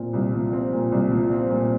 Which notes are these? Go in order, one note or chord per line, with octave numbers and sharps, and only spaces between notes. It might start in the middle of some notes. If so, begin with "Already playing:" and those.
Already playing: A#2 F3 C4
C2
F3
C4
A#2
C2
F3
C4
A#2